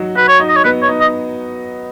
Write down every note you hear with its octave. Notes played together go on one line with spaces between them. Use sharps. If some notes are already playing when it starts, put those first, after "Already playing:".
Already playing: F#3 D#4 F#4
F#4 B4
C#5
D#4
D#5
C#5
B3 B4
C#5
D#4
D#5